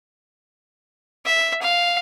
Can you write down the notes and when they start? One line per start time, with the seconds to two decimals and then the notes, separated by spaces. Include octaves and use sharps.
1.25 E5
1.62 F5